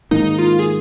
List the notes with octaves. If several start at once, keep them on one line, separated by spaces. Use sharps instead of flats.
G#2 D#3 A#3 D#4
F4
G#4